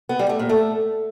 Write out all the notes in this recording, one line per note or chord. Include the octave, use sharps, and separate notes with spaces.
B3
G3
A3
A#2
A3